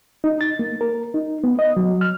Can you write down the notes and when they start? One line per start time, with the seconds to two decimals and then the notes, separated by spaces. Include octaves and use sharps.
0.24 D#4
0.41 A6
0.59 A#3
0.81 A#4
1.14 D#4
1.44 B3
1.59 D#5
1.77 F#3
2.01 F6